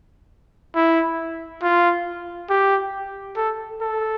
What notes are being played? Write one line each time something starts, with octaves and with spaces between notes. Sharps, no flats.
E4
F4
G4
A4
A4